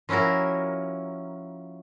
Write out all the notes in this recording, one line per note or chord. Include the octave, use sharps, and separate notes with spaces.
F3 C#4 E4 F#4 A#4